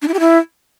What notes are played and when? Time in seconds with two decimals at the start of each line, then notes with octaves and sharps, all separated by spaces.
0.02 D4
0.08 E4
0.14 G4
0.20 E4